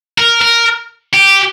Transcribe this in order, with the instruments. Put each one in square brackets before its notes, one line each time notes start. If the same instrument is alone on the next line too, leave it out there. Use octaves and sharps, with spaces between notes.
[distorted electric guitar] A#4
A#4
G4